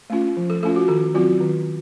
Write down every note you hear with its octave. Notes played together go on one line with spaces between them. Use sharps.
A3 C#4 F4
F3
A4
A3 C#4 F4 A4
F#4
D#3 A4
F#3 C4 F4 F#4
D#3